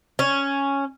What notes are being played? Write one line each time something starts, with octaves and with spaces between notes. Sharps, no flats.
C#4